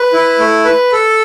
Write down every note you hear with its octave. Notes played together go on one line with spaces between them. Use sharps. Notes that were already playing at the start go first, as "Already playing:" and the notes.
Already playing: B4
E4
A3
B4
A4